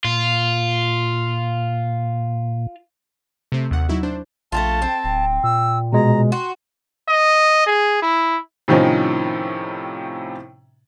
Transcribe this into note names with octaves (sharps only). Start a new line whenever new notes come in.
A#2 F4
C3 A3 C4
D#2 F#5
F#3 D#4 E4 F#4
D4 C5
A#1 A3 C4 F4 A5
C4
D1
A#2 E6
B2 G#3 A#5
F#4 C6
D#5
G#4
E4
A2 C3 D#3 F3 C#4 D#4